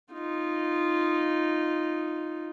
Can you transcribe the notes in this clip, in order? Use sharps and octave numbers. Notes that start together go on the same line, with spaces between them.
D#4 F4